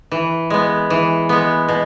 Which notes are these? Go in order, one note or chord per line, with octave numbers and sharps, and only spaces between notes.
E3
G#3 B3
E3
G#3 B3
B2